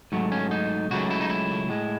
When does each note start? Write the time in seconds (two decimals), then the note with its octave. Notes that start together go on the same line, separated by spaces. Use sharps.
0.12 G#2 F#3 A3
0.32 C#4
0.51 D#4
0.91 C#2 C#3 F#3 A3 F#4
1.11 E4
1.21 D#4
1.30 E4
1.69 A2 G#3